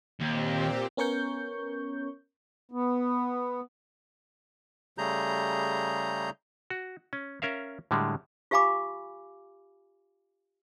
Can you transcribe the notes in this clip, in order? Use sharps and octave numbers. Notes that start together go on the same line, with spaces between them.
D#2 A#2 C4 G4
B3 C#4 A#4 C#5 C#6 G6
B3
C#3 G3 A3 G#4 A#5 G6
F#4
C#4
C#4 A#4 E5 F5
A2 D3 G3 G#3
F4 G4 F5 G#5 B5 D6